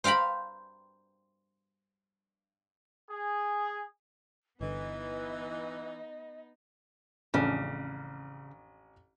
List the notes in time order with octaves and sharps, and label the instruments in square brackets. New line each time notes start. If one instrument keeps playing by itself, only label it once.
[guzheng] C5 F5 G5 A#5 B5
[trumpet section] G#4
[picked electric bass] G1 D3 [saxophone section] E3 [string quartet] B3 D#4 [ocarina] D#5
[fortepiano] A1 F2 D4 [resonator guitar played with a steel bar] C#3